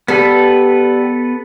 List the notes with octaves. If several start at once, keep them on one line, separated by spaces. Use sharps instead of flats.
G3 B3 A4 B4